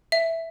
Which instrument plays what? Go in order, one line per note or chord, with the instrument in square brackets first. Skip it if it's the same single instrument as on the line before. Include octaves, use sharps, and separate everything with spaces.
[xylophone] E5